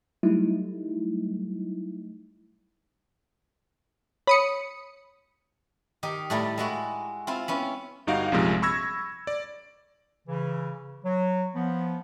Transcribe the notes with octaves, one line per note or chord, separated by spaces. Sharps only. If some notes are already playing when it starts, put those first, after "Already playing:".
F#3 G3 A3 D#4 E4
C#5 B5 D#6 C#7
D#3 D#4 G4
A2 G3 A3 E4 A4 A#5
G#3 E4 F#4 A5
C4 E4 F4
B3 C#4 E4
G1 G3 D#4 F#4 F5 D7
A#1 F#2 C3 F3 G3 G#3
B5 C#6 E6 G#6 A#6
D5
C#3 E3
F#3
F3 B3